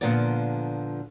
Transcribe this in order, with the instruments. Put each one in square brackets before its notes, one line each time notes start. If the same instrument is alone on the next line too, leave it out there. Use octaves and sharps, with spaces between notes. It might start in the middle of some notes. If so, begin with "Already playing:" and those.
[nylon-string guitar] A#2 D3 F3 B3 A#4 D5